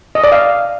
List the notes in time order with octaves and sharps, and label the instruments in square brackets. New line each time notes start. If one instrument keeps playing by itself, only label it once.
[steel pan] D#5
D5
F5